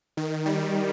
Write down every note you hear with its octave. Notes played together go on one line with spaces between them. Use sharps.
D#3
G3